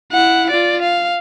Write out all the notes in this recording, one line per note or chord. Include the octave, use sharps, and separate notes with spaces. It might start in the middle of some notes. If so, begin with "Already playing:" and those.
E4 F#5
F4 D5
F5